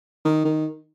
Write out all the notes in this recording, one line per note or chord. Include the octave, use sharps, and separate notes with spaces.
D#3
D#3